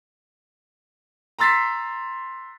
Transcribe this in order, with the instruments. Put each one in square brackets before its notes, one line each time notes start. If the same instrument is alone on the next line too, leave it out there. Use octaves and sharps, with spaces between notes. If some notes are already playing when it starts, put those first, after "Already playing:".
[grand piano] A#5 C6 E6 A6 B6 C7